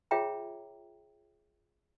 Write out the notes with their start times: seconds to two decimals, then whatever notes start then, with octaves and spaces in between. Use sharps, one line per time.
0.11 F4 G#4 C#5 E5 G5 A#5